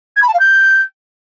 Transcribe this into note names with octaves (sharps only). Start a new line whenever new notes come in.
G#6
B5
A5
F5
G6